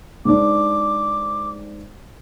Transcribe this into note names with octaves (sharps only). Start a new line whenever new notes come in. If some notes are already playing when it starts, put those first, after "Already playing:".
G#2 D4 D6